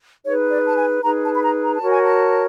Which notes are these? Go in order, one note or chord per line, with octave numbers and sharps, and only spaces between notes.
D#4 G#4 B4 C#5
D5
A5
G#5
D#4 G#4 B4 A#5
A5
B5
A#5
A#5
A5
F#4 A#4 C#5
G#5
A5